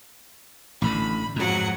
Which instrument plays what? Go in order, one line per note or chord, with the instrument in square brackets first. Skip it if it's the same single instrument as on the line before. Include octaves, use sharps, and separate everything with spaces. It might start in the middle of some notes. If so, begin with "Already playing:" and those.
[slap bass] A1 A2 D3 [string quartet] B5
[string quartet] F2 F#3 F#5 [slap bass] G#2